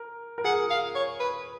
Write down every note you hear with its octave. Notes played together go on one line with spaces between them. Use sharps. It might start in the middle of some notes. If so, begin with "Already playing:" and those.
Already playing: A#4
A#4
G#4 F#5
F5
C#5
B4